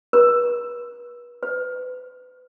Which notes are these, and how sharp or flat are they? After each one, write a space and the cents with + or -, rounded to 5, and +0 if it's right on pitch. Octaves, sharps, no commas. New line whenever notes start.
B4 -35
B4 +30